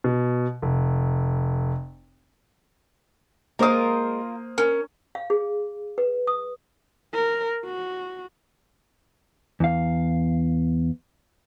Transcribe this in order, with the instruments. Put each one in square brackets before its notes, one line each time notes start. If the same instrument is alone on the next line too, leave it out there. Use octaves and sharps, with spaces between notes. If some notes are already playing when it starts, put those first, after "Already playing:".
[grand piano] B2
F1
[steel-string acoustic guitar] G#3 [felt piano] A#3 C5 D#6 [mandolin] F4 A#4
[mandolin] C#4 [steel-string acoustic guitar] A#4
[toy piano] F5
G#4
B4
D#6
[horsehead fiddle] A#4
F#4
[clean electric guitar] E2 F5